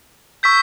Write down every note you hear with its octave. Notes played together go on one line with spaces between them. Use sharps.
C#6 E6 G6 B6